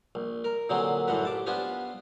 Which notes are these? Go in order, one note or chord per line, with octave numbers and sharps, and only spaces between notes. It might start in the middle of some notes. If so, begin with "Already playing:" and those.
A#1
A#4
A#2 D3 F#3 C4 G#4
F#2 A2 E3 F3 F#4 B4
A1 A5 D6
B3 D4 F4 G4 C5 G#5